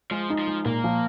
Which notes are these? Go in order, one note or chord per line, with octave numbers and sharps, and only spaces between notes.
F3 G#3
D#4
F3
G#3
A#2 A#3
F3